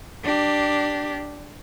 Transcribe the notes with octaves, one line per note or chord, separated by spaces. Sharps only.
D4 G4